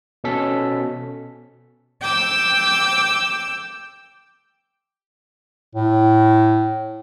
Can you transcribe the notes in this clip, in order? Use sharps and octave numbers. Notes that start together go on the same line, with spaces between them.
B2 C#4 A4 B6
G5 D6 E6 G6
A2